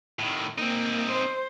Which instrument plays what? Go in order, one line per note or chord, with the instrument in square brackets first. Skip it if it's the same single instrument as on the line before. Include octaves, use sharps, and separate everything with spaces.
[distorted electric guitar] A2 D#3
[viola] A#3 [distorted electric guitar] C4 D#4
[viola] C5